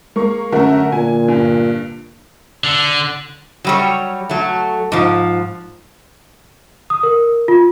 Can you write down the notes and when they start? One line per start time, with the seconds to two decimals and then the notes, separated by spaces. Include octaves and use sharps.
0.16 G#3 A#3 C#6
0.52 F#2 D3 A3 F#4 A#4
0.92 A#2 G#5
1.28 G2
2.64 D3
3.65 F#3 G3 C#5
4.29 F#3 A3
4.92 G#2 F3
6.90 D#6
7.03 A#4
7.48 F4